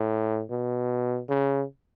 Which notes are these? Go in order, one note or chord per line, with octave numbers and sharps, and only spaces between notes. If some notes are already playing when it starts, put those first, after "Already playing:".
Already playing: A2
B2
C#3